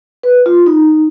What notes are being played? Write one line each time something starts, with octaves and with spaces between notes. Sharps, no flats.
B4
F4
D#4